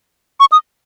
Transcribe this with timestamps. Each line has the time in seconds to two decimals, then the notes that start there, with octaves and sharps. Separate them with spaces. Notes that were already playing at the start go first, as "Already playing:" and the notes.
0.40 C#6
0.52 D#6